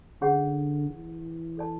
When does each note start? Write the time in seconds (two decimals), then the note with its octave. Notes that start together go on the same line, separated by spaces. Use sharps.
0.21 D3 C#4 G#4 C#5 F#5
0.89 E3
1.57 A4 D5 A5